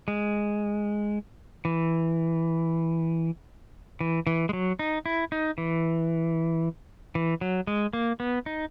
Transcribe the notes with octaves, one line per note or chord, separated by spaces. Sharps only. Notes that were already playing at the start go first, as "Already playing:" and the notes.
G#3
E3
E3
E3
G#3
F#3
D#4
E4
D#4
E3
E3
F#3
G#3
A#3
B3
D#4